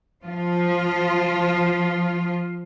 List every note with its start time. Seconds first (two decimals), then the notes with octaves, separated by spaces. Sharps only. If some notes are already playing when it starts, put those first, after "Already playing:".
0.24 F3 F4